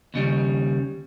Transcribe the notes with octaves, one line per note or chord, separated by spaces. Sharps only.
D#2 C#3 G3